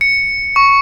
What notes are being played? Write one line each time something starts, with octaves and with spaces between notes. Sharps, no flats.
C#7
C#6